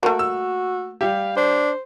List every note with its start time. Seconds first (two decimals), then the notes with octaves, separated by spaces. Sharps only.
0.03 A3 A#3 F#4
0.19 E6
1.01 G3 G4 F5
1.37 D4 C5